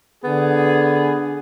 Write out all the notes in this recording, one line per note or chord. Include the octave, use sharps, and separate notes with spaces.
D3 B3 G#4